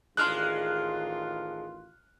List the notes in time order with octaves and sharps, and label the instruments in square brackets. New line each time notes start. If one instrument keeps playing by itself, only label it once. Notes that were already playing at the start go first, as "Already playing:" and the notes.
[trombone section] A1 D#3 F4 [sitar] G#3 D4 [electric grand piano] C6 F6 F#6